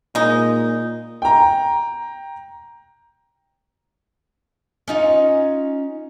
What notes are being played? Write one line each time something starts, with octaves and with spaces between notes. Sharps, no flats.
A#2 G#3 D#4
G5 A#5
C#4 D#4 F4